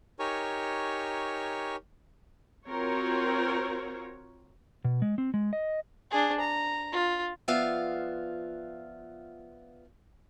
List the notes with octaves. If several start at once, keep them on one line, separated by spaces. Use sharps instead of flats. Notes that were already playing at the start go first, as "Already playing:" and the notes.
D#4 G4 A#4 C#5 G#5 C#6
C4 F4 F#4 A#4 C#5
B2
G#3
C4
G#3
D#5
D4 G#4
A#5
F4
F3 B3 F4 D5 E5 F5